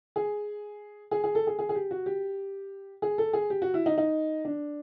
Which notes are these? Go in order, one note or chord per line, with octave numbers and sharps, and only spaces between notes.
G#4
G#4
G#4
A4
G#4
G#4
G#4
G4
F#4
G4
G#4
A4
G#4
G4
F#4
E4
D#4
D#4
D4